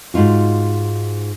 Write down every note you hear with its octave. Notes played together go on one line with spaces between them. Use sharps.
G#2 D#4 F4 F#4